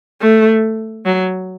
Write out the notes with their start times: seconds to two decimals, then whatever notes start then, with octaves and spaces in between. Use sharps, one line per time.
0.21 A3
1.06 F#3